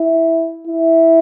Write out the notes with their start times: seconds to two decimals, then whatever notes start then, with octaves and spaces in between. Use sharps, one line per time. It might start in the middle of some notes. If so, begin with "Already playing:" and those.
Already playing: E4
0.67 E4